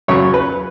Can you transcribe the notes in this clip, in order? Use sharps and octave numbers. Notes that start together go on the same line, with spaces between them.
F#2 C#3 F#3 C#5
B4